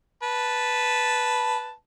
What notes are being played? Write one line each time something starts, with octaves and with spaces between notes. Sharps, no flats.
B4 A5